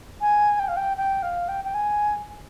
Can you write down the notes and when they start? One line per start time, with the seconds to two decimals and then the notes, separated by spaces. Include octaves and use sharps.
0.21 G#5
0.59 G5
0.68 F5
0.76 G5
0.97 G5
1.22 F5
1.48 G5
1.64 G5
1.74 G#5